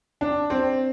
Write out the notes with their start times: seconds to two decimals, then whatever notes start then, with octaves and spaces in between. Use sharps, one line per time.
0.21 D4
0.50 C4